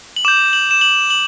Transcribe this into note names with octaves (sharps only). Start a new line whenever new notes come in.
F#7
D6 G6 E7
F#7
E7
F#7
F#7